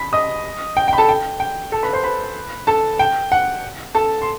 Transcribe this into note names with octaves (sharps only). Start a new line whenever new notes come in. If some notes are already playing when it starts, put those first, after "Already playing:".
Already playing: B5 B6
D#5 D#6
G5
G5
B5
A4 A5
G5
G5
A4 A5
B4 B5
C5 C6
B4 B5
A4 A5
G5
F#5
A4 A5
C6